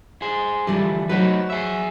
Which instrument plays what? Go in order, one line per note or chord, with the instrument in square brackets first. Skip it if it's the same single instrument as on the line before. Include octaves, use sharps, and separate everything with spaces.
[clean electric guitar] G#4 C5
[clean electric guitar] D3 E3 F3 [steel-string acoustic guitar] G3 A3
[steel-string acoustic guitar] F#3 F#4 C5 [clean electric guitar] A3 D#4 B4
[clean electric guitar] G#4 E5